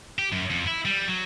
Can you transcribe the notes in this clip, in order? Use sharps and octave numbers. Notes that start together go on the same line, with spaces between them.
G4
F#2
F2
E4
G3
F#3